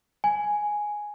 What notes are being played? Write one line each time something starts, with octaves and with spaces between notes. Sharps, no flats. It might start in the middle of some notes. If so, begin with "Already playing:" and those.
G#5